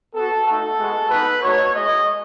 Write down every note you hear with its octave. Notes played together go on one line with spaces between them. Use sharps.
B3 F#4 A4
A3 D#4 F#4 A4
G#3 B3 F#4
B3 D#4 F#4 B4
A3 D#4 F#4 C#5
G#3 B3 E4 D#5